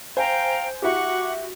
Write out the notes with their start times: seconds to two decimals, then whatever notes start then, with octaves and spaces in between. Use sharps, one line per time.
0.17 C5 F5 G5 G#5 A#5
0.82 E4 F#4 G4 F#5 C#6 D6